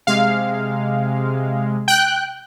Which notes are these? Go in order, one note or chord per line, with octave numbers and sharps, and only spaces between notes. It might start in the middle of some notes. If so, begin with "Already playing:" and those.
C3 G#3 F5
G5 F#6